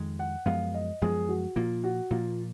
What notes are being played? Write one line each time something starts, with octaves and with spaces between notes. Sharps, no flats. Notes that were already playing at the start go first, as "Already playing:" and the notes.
Already playing: F2 D#3 G#3
F#5
F#2 F3 G#3 B3 F5
D#5
F#2 F3 G#3 B3 G#4
F#4
A#2 F3 A#3 F4
F#4
A#2 F3 A#3 F4